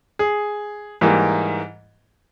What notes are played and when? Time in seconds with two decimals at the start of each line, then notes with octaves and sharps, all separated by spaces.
0.19 G#4
1.01 G#2 E3 G3 A#3